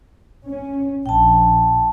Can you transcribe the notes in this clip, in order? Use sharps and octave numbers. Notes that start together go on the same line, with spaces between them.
C#4
A#1 G5 A5